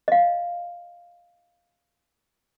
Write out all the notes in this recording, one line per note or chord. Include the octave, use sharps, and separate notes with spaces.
D#5 F5